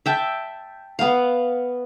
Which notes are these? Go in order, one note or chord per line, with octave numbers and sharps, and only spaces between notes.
E5 G5 A5
B3 F5